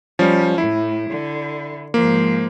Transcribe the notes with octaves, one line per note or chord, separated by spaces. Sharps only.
F3 G3 C#4
A2 E4
D3
G#2 F3 A#3